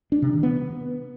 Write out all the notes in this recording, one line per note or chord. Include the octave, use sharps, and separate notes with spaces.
D4
C3
D#3
B3